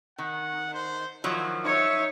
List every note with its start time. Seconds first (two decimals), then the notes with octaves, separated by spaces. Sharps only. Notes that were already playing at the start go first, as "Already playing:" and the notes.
0.18 D#3 F#5
0.74 C5
1.24 D#3 F3 F#3 E4
1.64 D#4 C#5 E5 C#6